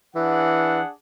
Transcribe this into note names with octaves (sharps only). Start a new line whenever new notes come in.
E3 D4 G#4 F#5